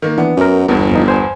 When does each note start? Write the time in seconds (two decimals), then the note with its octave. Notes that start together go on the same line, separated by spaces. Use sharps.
0.02 D#3 A#3
0.18 E3 B3 D4
0.37 F#2 C#4 A#4
0.68 G1 E2 G2
0.91 F2 F3 D#4
1.08 C5 G#5